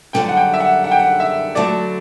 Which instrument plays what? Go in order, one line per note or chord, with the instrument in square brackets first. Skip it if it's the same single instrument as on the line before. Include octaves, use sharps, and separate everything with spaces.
[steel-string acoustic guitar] F#2 D3 G3 [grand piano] G5
[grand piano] F#5
G5
E5
F#5
F#5
G5
F#5
E5
[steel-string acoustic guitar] D2 D3 F#3 A3 [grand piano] D5